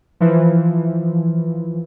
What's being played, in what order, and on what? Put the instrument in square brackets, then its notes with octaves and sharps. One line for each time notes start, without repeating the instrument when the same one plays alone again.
[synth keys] E3 F3